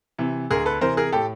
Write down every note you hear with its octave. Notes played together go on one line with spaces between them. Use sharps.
C3 E3
D2 G#4 A#4
A4 B4
C3 E3 A#4 C5
G#4 A#4
A2 G4 A4